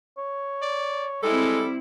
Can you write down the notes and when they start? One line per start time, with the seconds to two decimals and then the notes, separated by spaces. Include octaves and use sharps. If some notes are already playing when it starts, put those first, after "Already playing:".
0.18 C#5
0.62 D5
1.23 G3 G#3 C4 E4 A4